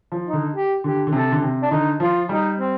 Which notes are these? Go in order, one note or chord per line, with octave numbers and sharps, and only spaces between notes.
F3
D#4
D3
G4
D3 G4
D3
C3 A4
D3
C3
D4
D3 D#4
F3 F4
G3 D#4
C4